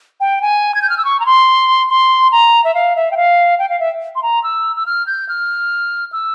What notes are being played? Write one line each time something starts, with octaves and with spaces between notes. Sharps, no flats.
G5
G#5
G#6
G6
F6
E6
C#6
A#5
C6
C6
A#5
E5
F5
E5
G5
F5
G5
F5
E5
C6
A#5
E6
E6
F6
G6
F6
E6